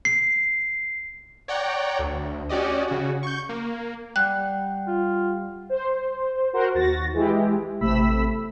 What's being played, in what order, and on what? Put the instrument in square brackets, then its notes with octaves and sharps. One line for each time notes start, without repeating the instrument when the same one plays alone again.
[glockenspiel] C7
[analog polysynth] C#5 D5 F#5 G5 A#5
D2
C#4 F#4 G4 D5 D#5
C#3 F#4
C#6 G6
A#3
[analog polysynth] G3 [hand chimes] F#5 G5 [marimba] F#6
[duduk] F4
[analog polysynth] C5
F#4 A#4 C5 F#5
D#2 F#4 A6 A#6
E3 G#3 E4 G4
A1 C3 A3 B5 E6 B6